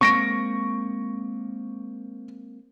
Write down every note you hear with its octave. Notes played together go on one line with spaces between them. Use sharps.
G#3 A#3 C4 C#6 A#6 D7